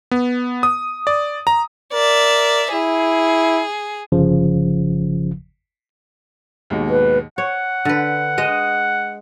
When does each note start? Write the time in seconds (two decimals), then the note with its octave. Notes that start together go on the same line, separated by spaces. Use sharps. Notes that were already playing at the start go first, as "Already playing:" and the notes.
0.11 B3
0.63 D#6
1.07 D5
1.47 A#5
1.93 A#4 D5 E5
2.73 E4 G#4
4.12 G1 C#3 F3
6.70 D#2 G#2 B2
6.90 B4
7.38 C#5 F#5
7.85 D3 B4
8.38 G#3 D#5